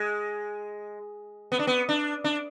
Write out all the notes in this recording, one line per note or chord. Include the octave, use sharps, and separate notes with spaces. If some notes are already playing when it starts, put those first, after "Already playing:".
Already playing: G#3
B3
D4
B3
D4
D4